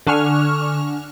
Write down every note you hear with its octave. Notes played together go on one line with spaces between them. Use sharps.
D3 D4 G#5 C#6 F6 F7